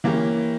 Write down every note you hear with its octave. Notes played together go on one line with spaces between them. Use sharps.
E3 A#3 C#4 G4